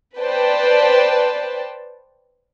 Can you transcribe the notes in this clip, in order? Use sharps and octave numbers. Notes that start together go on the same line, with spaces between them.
B4 C5 D5 G5 A5